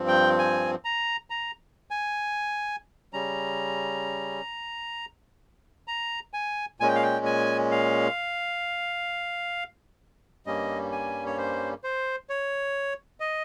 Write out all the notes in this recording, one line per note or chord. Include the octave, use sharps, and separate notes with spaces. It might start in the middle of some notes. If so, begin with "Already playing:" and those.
Already playing: G2 F3 C4
G5
G#5
A#5
A#5
G#5
C#3 G3 C#4 A#5
A#5
G#5
A#2 G#3 C#4 G#5
G5
F5
G5
G#5
F5
G2 G3 A#3 C#4 D#5
G#5
C#5
C5
C5
C#5
D#5